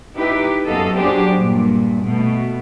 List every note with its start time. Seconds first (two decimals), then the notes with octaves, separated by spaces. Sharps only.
0.17 D#4 E4 G4 B4
0.67 F#2 B3 A4 D#5 F5
0.97 F#3 B3 D4 G4 G#4 C5
1.35 G2 A#2
2.03 B2 A3